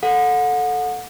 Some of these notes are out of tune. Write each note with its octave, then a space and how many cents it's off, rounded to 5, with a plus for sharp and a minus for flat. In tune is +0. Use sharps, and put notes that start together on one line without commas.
A4 +0 F#5 -30